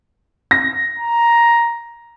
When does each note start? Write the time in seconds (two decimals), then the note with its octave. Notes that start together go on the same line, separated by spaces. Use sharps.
0.51 A#6
0.99 A#5